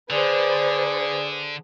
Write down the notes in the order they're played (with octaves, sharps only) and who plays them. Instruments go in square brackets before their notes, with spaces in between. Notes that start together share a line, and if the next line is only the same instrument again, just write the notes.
[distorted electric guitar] D3 [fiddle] G#4 [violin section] B4 C5 [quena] D5